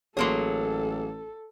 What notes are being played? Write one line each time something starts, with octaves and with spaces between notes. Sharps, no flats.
A1 F#3 A#3 G#4 A4 C#5 C6